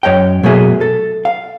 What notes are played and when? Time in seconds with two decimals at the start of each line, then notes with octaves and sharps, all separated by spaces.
0.03 F#2 C#5 D#5 G5
0.43 B2 F#3 A3 A#3 G#4 E5
0.81 A4
1.25 F5